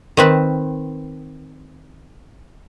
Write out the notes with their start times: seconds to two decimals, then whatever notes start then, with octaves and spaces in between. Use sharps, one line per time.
0.17 D#3 C4 B4